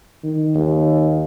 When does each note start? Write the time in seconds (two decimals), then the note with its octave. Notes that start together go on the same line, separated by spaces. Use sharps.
0.23 D#3
0.55 D#2